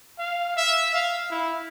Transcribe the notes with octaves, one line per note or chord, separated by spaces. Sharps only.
F5
E5
F5
E4